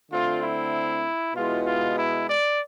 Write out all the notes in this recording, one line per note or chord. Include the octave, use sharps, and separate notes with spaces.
D3 A3 C4 F4
E4
B2 G#3 B3 E4 F4
F4
E4
D5